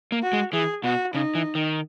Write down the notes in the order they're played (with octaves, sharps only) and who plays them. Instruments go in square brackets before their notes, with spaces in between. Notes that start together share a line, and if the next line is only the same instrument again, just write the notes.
[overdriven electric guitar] A#3
[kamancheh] F#4
[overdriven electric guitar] G#3
[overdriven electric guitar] E3 [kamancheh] G#4
[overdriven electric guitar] B2 [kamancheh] F#4
[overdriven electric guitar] C#3 [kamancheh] D#4
[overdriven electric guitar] E3
D#3